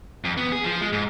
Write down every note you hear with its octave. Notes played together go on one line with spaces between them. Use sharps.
F2
B3
G#4
F3
G#3
G#2